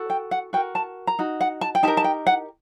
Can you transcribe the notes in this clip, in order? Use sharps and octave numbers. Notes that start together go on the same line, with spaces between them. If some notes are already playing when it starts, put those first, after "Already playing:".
Already playing: F#4 A4
G5
F#5
F#4 A#4 G5
A5
A#5
D#4 F#4
F#5
A5
G5
D#4 G4 A#4 A5
A5
G5
F#5